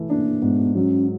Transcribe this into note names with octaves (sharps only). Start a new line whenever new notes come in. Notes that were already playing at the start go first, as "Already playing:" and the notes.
Already playing: E3 A3
A#3 D4
G#2 B3
F#3 C#4